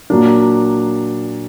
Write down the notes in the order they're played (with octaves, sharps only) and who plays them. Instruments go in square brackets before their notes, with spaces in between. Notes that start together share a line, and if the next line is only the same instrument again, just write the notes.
[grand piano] A#2 F#3 A#3 D4